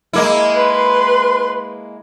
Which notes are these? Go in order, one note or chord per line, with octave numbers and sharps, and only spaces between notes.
G#3 A#3 E4
B4 C6